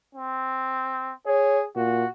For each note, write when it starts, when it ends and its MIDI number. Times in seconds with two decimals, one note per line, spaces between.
0.15 1.14 60
1.27 1.66 68
1.27 1.59 73
1.76 2.04 46
1.76 2.09 66